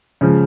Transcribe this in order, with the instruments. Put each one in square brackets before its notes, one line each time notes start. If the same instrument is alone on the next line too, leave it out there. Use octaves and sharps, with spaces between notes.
[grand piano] C#3 F3 G#3